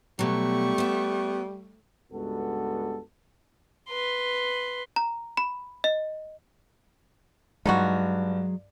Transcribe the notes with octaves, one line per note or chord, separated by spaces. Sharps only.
B2 F#3 G3 A3 C#6
B3 E5
C#2 G2 G#3 B3 F#4 A4
B4 C6
A#5
B5
D#5
G2 F#3 G#3 D#4 F4 F#4